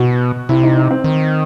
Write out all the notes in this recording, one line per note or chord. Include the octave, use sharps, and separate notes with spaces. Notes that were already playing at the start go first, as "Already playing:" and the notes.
Already playing: B2 F#4
C3 E4
D#4
D#4
C4
D#3